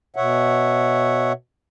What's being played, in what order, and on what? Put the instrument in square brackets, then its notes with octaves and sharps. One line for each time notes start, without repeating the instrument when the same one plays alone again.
[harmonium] B2 C#5 E5 F#5